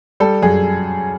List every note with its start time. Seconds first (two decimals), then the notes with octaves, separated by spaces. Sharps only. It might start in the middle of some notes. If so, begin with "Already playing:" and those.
0.20 G3 A4
0.42 F#2 G#4